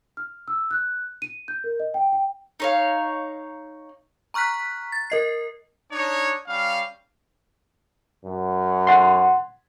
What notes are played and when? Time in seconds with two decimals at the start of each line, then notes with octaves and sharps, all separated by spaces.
0.17 F6
0.48 E6
0.71 F#6
1.22 D#7
1.48 G6
1.64 A#4
1.80 D#5
1.94 G5
2.12 G5
2.60 D#4 C#5 F5
4.34 A#5 C#6 F6 F#6 B6
4.92 A6
5.10 A#4 D#5 C7
5.91 D4 D#4 C#5
6.46 G3 C#4 F5
8.25 F#2
8.87 F#5 C6